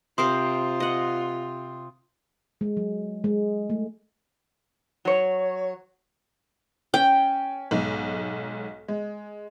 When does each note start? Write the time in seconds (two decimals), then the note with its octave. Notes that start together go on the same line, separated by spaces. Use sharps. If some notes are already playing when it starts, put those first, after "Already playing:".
0.18 C3 F4 A#4 C5 C6 D#6 C7
0.80 D#5 F#5
2.61 G#3
2.77 F#3
3.24 G#3
3.70 A3
5.05 F#3 C#5
6.94 C#4 G5
7.71 B1 G#2
8.88 G#3